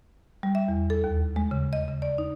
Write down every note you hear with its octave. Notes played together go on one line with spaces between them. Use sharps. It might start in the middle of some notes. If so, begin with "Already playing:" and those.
G3
E5
E2
A4
D#2
G#3
C#3
D#5
C#3
D5
D#4